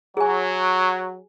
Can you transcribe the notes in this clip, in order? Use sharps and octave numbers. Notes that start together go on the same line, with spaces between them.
F#3 G#4 G#5